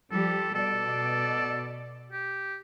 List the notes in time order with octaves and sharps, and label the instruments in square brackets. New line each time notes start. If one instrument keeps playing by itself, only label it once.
[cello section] F3 G3 G4 [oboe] A4
[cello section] B2 D5 [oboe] A4
[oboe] G4